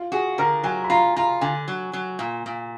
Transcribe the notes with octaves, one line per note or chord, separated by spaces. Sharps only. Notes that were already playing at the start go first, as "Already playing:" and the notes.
Already playing: F4
F#4 G#4
D3 A#4
F#3 G#5
B5
F4 A#5
F4 A#5
D3 G#5
F#3
F#3
A#2
A#2